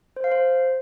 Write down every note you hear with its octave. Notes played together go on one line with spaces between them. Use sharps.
C5
F5
C5